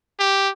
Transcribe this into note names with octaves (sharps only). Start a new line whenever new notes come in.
G4